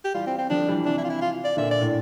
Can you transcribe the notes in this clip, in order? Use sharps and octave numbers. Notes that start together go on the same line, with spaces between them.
G4
E3 G3 F4
C4
C4
D3 F3 D4
E3 G3
C3 E3 D4
E4
F4
E4
F4
D5
A#2 D3 E5
D5
A2